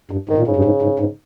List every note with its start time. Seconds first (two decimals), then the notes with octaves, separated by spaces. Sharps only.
0.11 G2
0.29 G#2 D#3
0.38 A#2
0.47 G#2 C#3
0.56 G2
0.65 G#2
0.82 G#2
0.99 G#2